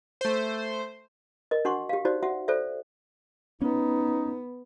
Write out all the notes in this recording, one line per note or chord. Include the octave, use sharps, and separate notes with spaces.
A3 C5
A#4 D#5
D4 F#4 F#5 C6 C#6
G4 F5
D#4 F#4 C5 D5
F#4 E5 F#5
A4 C5 D5 E5
B3 C#4 D#4